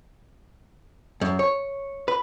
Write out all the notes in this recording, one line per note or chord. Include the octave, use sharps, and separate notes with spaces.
F#2
C#5
B4